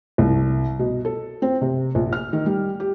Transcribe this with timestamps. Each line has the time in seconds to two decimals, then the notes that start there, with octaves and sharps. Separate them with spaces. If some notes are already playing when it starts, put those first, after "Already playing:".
0.18 C2
0.79 B2
1.05 A4
1.42 C4
1.61 C3
1.95 A#1
2.13 F6
2.33 D#3
2.46 G3
2.80 G4